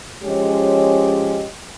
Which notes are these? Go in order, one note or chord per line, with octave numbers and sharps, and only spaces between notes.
F3 G#3 C#4 G4 C#5 D#5